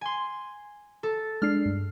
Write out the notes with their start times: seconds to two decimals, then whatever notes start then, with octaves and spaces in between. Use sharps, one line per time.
0.01 G#5 C6
1.03 A4
1.42 G#3 D4 F6 C7
1.66 G2